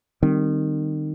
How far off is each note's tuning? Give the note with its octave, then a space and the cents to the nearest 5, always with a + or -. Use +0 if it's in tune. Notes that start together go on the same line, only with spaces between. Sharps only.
D#3 -25 G3 +0 C4 -10